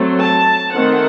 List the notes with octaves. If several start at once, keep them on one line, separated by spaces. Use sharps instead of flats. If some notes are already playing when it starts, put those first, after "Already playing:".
Already playing: F#3 A3 C4
A5
D#3 A3 C4 F#5